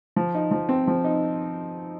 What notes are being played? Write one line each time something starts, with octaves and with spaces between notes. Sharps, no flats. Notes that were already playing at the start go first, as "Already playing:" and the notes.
F3
D#4
F3
C4
F3
D#4